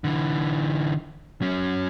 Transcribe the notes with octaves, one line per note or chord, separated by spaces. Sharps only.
D3 E3
F#3 C#4